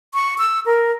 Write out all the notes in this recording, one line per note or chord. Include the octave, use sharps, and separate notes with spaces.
C#6
E6
A#4